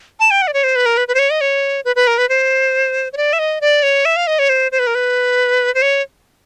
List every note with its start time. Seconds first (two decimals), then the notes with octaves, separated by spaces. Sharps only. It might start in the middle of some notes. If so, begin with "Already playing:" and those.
0.20 A5
0.31 G5
0.42 F#5
0.48 D5
0.54 C#5
0.64 C5
0.76 B4
0.86 A#4
0.97 B4
1.08 B4
1.15 C5
1.19 C#5
1.30 D#5
1.41 C#5
1.85 B4
1.96 B4
2.07 A#4
2.18 B4
2.29 C5
3.13 C#5
3.17 D5
3.33 E5
3.39 D#5
3.61 D5
3.83 C#5
4.05 E5
4.16 F5
4.27 D#5
4.39 C#5
4.49 C5
4.72 C5
4.79 B4
4.87 A#4
4.95 B4
5.75 C5
5.82 C#5